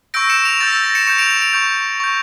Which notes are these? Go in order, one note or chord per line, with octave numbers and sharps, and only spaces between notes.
C#6 E6 G6 A#6 D7
C#7 E7
D7 F7
C#6 E6 G6 A6
A#6
A#6
C#7 E7
C#6 G6 C#7 E7
D7 F7
C#7 E7
D7 F7
C#6 G6
C#6 G6